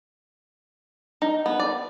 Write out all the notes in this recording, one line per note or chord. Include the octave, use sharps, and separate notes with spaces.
D#4
B3
D5